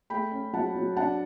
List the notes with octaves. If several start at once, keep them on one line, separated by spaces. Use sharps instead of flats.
A3 G5 B5
C#4
F#3 F#5 A5
F#3
D4 F#5 A5